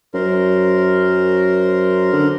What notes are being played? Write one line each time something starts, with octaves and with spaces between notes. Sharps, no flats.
F#2 A#4 C5
D3